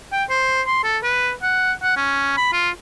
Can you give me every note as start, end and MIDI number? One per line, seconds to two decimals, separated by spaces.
0.12 0.23 79
0.30 0.62 72
0.67 0.83 84
0.84 0.98 69
1.03 1.31 71
1.43 1.72 78
1.83 1.97 78
1.97 2.33 61
2.37 2.52 83
2.53 2.70 65